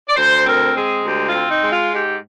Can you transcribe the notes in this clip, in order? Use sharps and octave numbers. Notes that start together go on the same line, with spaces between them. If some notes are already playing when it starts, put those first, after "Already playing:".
D5
D2 C5
C4 A#4
G#3 G#4
D2 G4
F4
C4
D#4
G#3
F4
G#2 G4